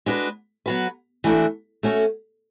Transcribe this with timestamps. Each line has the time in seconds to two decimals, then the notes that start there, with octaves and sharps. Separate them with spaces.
0.06 G#3 D4 F#4 B4
0.66 F#3 B3 F#4 B4
1.24 E3 A3 D4 F#4 A4
1.83 A3 C#4 F#4